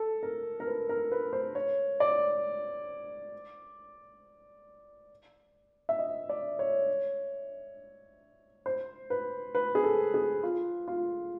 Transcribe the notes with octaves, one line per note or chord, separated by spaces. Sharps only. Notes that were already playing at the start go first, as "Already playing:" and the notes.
Already playing: A4
A#4
A#4
B4
A#4
B4
C5
C#5
D5
E5
D#5
D5
C#5
C5
B4
B4
G#4
A4
G#4
F4
F4